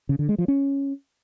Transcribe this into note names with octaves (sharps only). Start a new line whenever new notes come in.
C#3
D3
G#3
F3
C#4